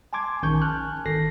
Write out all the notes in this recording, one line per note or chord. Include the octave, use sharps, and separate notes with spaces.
G#5 A5 C6 D6 G#6
A#1 D#3 C#4 G#5 C#6 G6
A5 F6 F#6
G#1 D#3 A4 A#6 C7